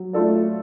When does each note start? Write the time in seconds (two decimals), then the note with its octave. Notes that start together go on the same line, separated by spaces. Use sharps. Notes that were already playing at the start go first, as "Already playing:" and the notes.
Already playing: F#3
0.13 A3 F4 A4 D5